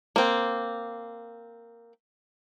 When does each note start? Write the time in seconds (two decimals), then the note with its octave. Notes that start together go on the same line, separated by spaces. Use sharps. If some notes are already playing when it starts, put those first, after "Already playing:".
0.16 A#3 C4